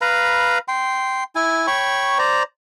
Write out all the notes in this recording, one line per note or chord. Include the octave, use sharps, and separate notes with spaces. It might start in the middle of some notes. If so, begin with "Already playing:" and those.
B4 F5 A#5 B5
G5 C6
E4 G#5
C#5 G5 B5 C#6
C5 D5 A#5